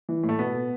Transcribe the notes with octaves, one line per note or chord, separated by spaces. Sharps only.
E3
A2
A3
B2 B3
B2